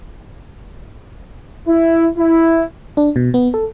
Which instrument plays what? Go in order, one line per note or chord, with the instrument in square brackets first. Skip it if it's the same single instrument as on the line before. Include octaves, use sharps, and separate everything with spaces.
[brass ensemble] E4
E4
[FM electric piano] D4
B2
B3
A4